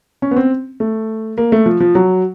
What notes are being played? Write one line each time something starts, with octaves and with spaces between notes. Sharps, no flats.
C#4
B3
C4
A3
A#3
A3
F3
F3
F#3